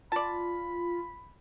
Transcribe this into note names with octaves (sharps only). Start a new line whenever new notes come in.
F4 D5 A5 B5